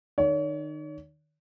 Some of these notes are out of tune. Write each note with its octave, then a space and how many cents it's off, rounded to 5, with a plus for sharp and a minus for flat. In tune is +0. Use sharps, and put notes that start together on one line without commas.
D#3 -30 C#5 +35